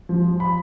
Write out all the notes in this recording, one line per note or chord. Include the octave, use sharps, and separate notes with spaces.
F3
F3
B5